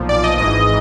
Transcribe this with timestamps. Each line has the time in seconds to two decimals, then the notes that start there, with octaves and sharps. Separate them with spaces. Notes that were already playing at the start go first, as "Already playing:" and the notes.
Already playing: B1 A#2 F3
0.09 D5
0.24 D#5
0.37 G#1 G#2 E3 D#5